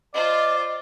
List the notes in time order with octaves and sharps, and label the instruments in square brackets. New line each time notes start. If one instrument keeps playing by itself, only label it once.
[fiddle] F4 C5 [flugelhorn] D5 [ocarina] D#5